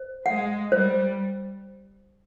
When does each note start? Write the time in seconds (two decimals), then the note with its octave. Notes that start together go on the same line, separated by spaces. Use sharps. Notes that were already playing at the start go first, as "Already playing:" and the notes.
Already playing: C5
0.26 G#3 F#5
0.72 G3 C5